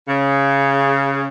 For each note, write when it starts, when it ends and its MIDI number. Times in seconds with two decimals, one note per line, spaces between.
0.08 1.26 49